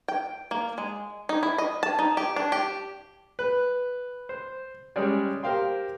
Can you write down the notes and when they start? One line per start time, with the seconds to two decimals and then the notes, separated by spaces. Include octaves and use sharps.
0.08 G5
0.51 A#3
0.78 G#3
1.29 D#4
1.43 E4
1.58 D#5
1.83 A5
1.99 D#4
2.17 G4
2.36 D4
2.52 G4
3.39 B4
4.29 C5
4.96 G3 G#3 C#4 G#4 D5
5.43 G4 A#4 C5 F5 G5 C6